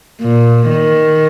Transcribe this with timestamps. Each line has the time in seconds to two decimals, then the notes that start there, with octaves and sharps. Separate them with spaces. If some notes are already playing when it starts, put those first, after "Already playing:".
0.21 A#2
0.69 D#3